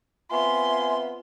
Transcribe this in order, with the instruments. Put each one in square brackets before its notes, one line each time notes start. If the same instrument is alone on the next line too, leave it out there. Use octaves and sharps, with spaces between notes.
[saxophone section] B3 C4 F4 [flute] E5 [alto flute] G#5 [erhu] C6